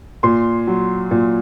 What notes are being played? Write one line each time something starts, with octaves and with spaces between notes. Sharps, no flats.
A#2 C6
F#3
A#2